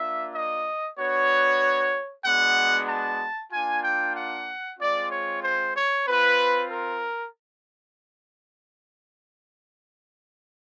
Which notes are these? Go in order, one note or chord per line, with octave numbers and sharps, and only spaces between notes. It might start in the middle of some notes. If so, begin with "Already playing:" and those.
Already playing: A#3 D4 F4 E5
D#5
B3 D4 F#4 C#5
G#3 B3 D4 F#4 F#5
A5
A#3 D4 F4 G#5
G5
F#5
G#3 C4 F4 D5
C#5
C5
C#5
C4 F4 B4
A#4